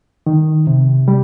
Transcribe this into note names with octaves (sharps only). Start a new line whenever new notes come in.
D#3
C3
G3